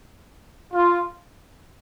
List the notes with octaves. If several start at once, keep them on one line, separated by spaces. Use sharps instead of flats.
F4